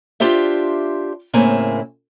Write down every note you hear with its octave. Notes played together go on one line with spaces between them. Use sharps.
D4 F4 G4 C5 E5
A2 C#3 A#3 C4 E4 G#5